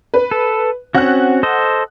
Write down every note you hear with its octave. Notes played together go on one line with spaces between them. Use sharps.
B4
A4
C4 C#4 F#4 F#5 F#6
A4 C5 D#5